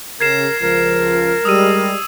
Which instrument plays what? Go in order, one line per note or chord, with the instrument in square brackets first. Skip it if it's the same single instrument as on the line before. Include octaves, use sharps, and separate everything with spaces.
[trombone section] C#3 [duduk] A#4 [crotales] G#6 C7 E7
[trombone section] C#2 F3 [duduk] A#4
[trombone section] G3 G#3 [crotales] D#6 E6 D#7